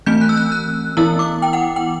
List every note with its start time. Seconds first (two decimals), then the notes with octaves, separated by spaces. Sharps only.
0.06 E3 A3 C4 G6
0.21 F#6
0.29 E6
0.37 F#6
0.52 F#6
0.97 E3 B3 E4 E6
1.19 D6
1.42 G5
1.53 F#5
1.76 G5